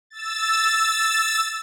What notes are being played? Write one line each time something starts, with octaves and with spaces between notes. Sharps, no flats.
E6 A6